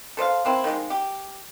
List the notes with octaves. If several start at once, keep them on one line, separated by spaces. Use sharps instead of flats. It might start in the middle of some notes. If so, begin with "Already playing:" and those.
A4 C5 D#5 F5
A#3 C4 E4
D#3 F3 G3 G#3
G4